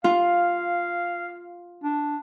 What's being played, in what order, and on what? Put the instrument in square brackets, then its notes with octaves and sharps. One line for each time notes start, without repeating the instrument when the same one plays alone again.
[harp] F4 [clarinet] F5
[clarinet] D4